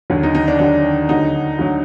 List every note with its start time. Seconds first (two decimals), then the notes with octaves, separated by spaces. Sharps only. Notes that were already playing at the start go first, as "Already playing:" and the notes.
0.10 D#2 D3 F#3
0.23 D#4
0.35 D#4
0.48 D4
0.59 D#2 D3 F#3 D4
1.09 D2 D3 F#3 D#4
1.58 D2 D3 F#3